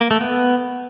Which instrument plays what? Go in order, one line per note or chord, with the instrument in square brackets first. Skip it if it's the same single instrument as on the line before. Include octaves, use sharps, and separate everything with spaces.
[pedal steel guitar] A#3
A3
B3